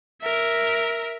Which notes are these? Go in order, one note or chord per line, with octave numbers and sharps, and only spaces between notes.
A#4 E5